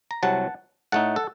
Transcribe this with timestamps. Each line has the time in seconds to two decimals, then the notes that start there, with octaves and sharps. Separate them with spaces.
0.11 A#5
0.23 C2 C3 F#3 F#5 A5
0.92 A2 A3 D#4 F#5 A5
1.16 A4